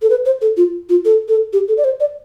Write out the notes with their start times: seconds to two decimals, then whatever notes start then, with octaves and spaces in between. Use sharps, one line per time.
0.02 A4
0.10 B4
0.26 C5
0.41 A4
0.57 F4
0.89 F4
1.05 A4
1.28 A4
1.53 G4
1.68 A4
1.78 D5
1.84 C5
2.00 D5